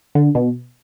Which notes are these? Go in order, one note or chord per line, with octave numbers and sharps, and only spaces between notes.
D3
B2